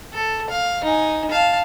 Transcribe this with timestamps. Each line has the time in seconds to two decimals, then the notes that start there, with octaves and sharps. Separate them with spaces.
0.13 A4
0.50 F5
0.84 D#4 G#5
1.31 F5 A5